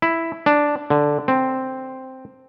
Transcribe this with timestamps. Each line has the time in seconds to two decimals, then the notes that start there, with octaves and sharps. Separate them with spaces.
0.02 E4
0.46 D4
0.90 D3
1.28 C4